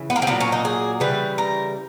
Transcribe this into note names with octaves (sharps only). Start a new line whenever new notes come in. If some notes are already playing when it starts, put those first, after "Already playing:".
Already playing: C#3 E3
B3
A#3
C4
A#2 F#3 A#3 B3
C#4
D#4
G#4
C#3 E3 G3 B4
A#4